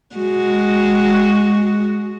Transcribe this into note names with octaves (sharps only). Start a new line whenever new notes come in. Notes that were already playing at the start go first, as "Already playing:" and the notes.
G#3 F#4